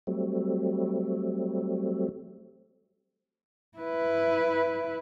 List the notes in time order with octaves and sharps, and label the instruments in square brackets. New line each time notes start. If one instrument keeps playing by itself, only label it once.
[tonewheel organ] F#3 G3 A3 C4
[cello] E4 B4